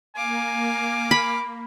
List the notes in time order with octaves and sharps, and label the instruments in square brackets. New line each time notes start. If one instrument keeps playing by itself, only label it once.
[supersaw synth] A#3 [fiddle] F5 D6 [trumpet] G#5
[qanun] B5